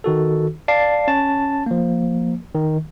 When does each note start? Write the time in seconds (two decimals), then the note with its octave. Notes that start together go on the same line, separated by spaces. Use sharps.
0.04 D#3 F#4 A4
0.68 D5 F5 A5 C7
1.08 C#4 A5
1.66 F3 A#3
2.54 D#3